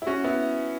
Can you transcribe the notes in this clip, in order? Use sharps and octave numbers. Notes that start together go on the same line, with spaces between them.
E4
C#4 F#4
B3 E4